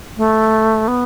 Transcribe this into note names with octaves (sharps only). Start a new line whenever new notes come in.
A3
B3